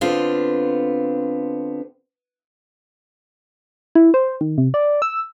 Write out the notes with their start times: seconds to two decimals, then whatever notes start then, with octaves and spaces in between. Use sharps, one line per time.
0.01 D3 B3 C4 F4
3.95 E4
4.14 C5
4.41 D#3
4.58 C3
4.74 D5
5.02 E6